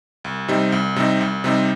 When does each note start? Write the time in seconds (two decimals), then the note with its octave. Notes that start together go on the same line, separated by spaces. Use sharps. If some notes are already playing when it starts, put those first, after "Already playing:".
0.24 C2
0.48 C3 G3 C4 D#4
0.72 C2
0.96 C3 G3 C4 D#4
1.21 C2
1.44 C3 G3 C4 D#4